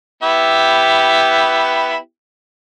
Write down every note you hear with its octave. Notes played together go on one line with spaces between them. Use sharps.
B3 E4 G4